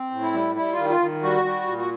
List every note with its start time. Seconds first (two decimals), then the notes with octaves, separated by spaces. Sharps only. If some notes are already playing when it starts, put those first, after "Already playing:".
Already playing: C4
0.11 A2
0.22 E4
0.33 G3
0.55 G3 E4
0.72 F4
0.78 D#3
0.89 F4
1.00 D#3
1.22 G3 F#4
1.45 G3
1.67 A#2
1.78 F#4